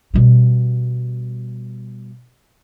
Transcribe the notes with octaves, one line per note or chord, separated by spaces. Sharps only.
B2 G3